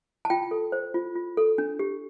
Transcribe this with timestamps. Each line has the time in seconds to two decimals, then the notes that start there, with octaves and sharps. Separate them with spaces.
0.25 A5
0.30 F4 G5
0.51 A4
0.72 C5
0.94 F4
1.16 F4
1.37 A4
1.58 D4
1.79 G4